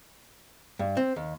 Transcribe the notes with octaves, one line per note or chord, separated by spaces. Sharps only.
G2
C4
D#2